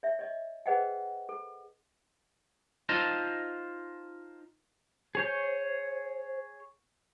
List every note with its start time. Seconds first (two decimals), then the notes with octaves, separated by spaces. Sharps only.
0.03 C#5 E5
0.19 C#5 D#5
0.66 G#4 B4 C5 D#5 F#5 G5
1.29 A4
2.89 D#4 F4 C5 D#5 A5
5.15 G#4 C5 C#5 G6